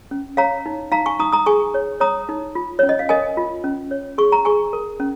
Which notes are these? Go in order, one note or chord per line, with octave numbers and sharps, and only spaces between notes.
C#4
C#5 F5 A#5
D#4
D#4 F5 A#5
G#5 C#6
D#4 A#5 D#6
A#5 D#6
G#4 G#5 C#6
C#5
C#5 A#5 D#6
D#4
F4
C#4 C#5
D#5
F5
A#4 D#5 G#5
F4
C#4
C#5
G#4 C#6
A#5
G#4 G#5 C#6
A#4
C#4